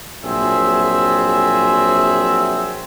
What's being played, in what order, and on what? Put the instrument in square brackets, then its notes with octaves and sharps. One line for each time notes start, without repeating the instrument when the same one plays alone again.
[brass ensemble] A#1 F#3 C4 G#4 E5